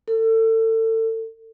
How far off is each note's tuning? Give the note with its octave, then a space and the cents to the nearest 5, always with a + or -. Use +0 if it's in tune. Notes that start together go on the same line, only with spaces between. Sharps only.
A4 +30